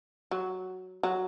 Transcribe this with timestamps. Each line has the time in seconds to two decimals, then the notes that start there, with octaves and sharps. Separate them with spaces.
0.31 F#3
1.03 F#3